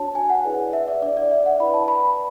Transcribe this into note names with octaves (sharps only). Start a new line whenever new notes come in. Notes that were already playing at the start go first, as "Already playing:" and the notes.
Already playing: D4 F#4 C#5 A5
G#5
F#5
E4 G#4 B4 D5
E5
D5
D4 G#4 C#5 D5
D5
E5
F#5
E4 B4 D5 B5
A5
B5